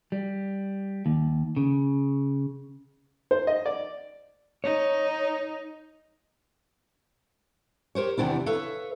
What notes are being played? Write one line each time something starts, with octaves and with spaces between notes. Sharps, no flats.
G3
D#2
C#3
C5
D#5
D5
D#4 C#5
G4 A#4 C5 C#5
E2 C3 D#3 D4 E4
A4 B4 C#5 E5 F5